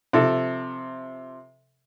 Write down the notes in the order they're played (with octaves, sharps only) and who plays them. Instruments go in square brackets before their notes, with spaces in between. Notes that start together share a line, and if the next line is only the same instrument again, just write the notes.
[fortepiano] C3 F3 A4